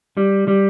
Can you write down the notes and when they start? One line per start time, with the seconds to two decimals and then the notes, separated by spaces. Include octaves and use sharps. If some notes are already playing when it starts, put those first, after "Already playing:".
0.17 G3
0.48 G3